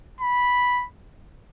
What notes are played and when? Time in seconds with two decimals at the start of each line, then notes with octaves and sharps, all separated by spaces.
0.21 B5